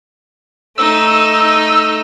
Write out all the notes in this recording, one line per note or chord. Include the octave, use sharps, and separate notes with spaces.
A3 D#4 E6